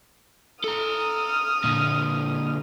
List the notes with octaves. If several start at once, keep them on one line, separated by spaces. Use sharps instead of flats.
A4 A#5 D#6 F6
A#2 D3